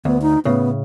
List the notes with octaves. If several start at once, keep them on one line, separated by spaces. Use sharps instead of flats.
D2 B3
D#4
A2 C#3 B3